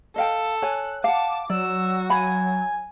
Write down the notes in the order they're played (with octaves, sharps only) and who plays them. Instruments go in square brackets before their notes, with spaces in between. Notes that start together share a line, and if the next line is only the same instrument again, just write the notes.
[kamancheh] A4 [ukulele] D#5 F5 G5
[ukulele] C#5 G#5 [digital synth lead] F#6
[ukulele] F5 F#5 [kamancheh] A5 [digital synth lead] D6
[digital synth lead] F#3 [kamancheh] F#4 [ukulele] D5 [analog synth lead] E6
[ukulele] F5 B5 [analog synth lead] G#5